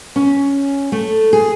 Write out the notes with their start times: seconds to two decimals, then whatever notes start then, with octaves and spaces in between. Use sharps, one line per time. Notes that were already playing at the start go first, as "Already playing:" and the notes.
0.16 C#4
0.92 A3
1.33 G#4